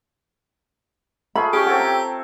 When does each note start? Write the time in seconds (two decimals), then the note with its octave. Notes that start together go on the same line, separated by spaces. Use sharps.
1.35 A3 F4 G#4 B5
1.53 C#4 G4 G#4
1.66 C4 A4 C#5 F#5
1.80 A#5